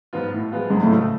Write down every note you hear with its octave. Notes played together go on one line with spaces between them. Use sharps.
G#2 F3 B3 F4
A2
F3 G#3 B3 F4
C#2 G#2
A2
C#3 F3 A3